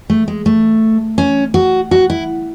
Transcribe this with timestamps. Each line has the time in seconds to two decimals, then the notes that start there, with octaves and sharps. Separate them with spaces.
0.10 A3
0.28 G#3
0.46 A3
1.18 C#4
1.54 F#4
1.91 F#4
2.10 E4